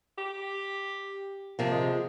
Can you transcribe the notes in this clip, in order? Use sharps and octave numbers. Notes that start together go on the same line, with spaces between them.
G4
D#2 C3 F3 A#3
G#3